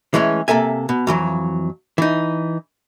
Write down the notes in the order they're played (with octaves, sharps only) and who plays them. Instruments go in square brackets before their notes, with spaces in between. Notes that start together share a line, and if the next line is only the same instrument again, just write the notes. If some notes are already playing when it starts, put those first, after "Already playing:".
[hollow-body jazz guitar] E3 G#3 A3 C#4
C3 A#3 A4 E5 G#5
B2
F2 E3 F#3
E3 D#4